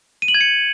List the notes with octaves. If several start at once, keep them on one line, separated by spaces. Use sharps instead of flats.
D#7
F#7
G#6
C#7